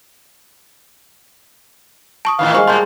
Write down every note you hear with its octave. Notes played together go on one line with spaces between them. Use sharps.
A5 C#6 D#6
A2 D#3 E3 F5
G3 G#3 C5 C#6
A2 G#3 A#3 A5 A#5 C6 G6